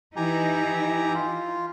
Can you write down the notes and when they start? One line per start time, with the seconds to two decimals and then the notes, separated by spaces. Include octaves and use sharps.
0.16 E3 D#4 E4 G4 G#5 A#5
1.14 F4